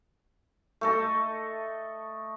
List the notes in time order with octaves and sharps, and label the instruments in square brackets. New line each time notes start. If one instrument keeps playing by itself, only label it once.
[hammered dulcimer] A3 A4 D#5